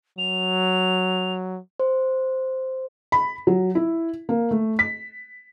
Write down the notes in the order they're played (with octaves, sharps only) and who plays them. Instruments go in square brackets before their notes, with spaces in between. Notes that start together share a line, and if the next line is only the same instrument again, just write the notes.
[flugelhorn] F#3 [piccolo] F7
[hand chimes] C5
[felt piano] B5
F#3
E4
A#3
A3
B6